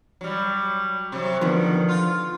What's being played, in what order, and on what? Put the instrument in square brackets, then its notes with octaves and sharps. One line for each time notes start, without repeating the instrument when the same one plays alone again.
[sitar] F#3 G3
C3 F#3
[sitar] D3 D#3 [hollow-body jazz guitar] F3 B3
[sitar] F4